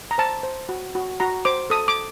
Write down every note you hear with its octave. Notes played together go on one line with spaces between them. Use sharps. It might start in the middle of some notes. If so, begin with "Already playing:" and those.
A#5
C5 A5
C5
F#4
F#4
F#4 A#5
C5 D6
A4 D#6
D6